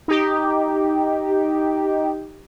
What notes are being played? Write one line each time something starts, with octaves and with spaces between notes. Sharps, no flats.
D#4 G4